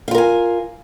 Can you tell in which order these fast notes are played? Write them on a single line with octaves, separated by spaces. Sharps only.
F5 F4 A#4 G#5